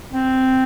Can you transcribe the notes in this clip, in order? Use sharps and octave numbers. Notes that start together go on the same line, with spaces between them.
C4